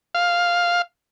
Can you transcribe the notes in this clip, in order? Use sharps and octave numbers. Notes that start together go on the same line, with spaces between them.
F5